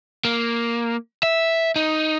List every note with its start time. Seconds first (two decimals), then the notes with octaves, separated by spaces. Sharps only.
0.25 A#3
1.23 E5
1.76 D#4